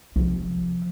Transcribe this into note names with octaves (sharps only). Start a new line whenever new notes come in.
C3 F3